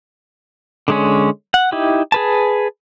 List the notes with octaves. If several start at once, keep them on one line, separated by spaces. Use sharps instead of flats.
D3 G#3 C#4
F#5
D#4 E4 G4
G#4 B4 A5